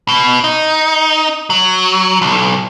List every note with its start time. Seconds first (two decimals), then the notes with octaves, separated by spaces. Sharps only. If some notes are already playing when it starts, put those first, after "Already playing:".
0.08 B2
0.44 D#4
1.50 F#3
2.22 B1